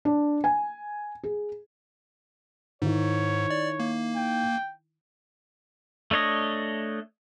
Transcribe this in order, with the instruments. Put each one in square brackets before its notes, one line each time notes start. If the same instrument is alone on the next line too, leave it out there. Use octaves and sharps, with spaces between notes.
[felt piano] D4
G#5
G#4
[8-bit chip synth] G#2 [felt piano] D#3 E4 [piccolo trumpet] C#5
[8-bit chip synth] D5
A#3
[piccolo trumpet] G5
[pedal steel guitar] A3 D4 C#5 D#5